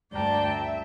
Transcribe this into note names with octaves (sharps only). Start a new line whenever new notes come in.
D2 G2 D5 G5 A5 A#5
E5